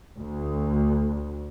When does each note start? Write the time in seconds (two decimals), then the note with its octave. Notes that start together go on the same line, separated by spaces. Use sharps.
0.18 D2